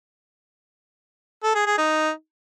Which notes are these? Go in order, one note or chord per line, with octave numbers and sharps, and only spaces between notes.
A4
G#4
G#4
D#4